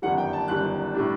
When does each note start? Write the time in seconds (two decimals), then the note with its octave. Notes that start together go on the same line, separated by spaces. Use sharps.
0.02 G1 F#2 D#3 G3 F#5
0.18 G5
0.33 A5
0.48 G1 F#2 D#3 G3 F#6
0.94 A2 G3 D4